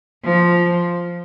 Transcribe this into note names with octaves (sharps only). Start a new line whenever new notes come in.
F3